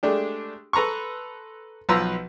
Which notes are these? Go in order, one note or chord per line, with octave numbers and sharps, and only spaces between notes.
G#3 A3 D4 G4
A4 B4 A#5 C6 C#6
B1 F3 B4 A#5 C6 E6